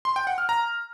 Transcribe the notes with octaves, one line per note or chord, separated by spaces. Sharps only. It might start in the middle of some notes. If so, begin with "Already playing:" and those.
C6
G5
F#5
F6
A#5